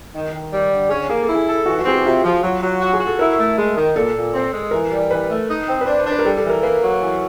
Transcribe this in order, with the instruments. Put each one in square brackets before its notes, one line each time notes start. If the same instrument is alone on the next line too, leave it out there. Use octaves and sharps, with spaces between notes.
[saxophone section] D#3
D#3
G3
D3
[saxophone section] C#4 [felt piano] G#4
[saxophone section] A#3 [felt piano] G#4
[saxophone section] E4 [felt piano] A4
[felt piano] G#4
[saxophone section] A4
[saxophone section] E3 [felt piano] F#4
[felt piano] F#4
[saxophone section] C4 [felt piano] G#4
[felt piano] G4
[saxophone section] C3 [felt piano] F4
[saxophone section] F3
F#3
F#3
F#4
[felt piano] G#4
[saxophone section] F#4
[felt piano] A4
[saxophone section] E4 [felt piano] A#4
[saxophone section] A3
G#3
D#3
[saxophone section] A#2 [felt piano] A4
[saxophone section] A#2
C4
G#3
[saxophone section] E3 [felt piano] A#4
[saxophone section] G3
[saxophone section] E3 [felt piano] B4
[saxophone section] A3
D#4
C4
[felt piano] B4
[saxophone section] D4 [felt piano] C5
[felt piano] C5
[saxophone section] D4
[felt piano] B4
A#4
[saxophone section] G3 [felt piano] A4
[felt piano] A4
[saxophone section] E3
[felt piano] A#4
[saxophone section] A#3 [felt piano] B4
[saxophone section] F#3
E3